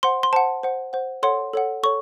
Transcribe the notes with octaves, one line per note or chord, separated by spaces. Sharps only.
C5 F#5 C6
C6
C5 F#5 A5
C5 F#5
C5 F#5
A4 C#5 F#5 C6
A4 C#5 F#5
A4 C#5 C#6